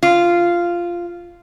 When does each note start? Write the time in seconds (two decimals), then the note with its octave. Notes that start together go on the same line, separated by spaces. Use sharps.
0.03 F4